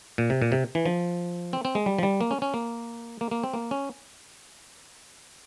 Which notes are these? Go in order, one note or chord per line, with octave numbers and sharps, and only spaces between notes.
A#2
C3
A#2
C3
E3
F3
C4
C4
G#3
G3
F3
G3
A#3
C#4
C#4
A#3
A#3
A#3
C4
A#3
C#4